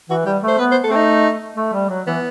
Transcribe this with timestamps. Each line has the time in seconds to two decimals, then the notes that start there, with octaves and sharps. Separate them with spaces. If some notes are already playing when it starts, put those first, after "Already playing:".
0.10 E3 F#4
0.26 G3 G4
0.43 A3 C5
0.59 B3 B4
0.71 C5
0.83 A3 A4
0.91 C4
0.96 D#4
1.57 A3
1.73 G3
1.90 F#3
2.07 E3 B3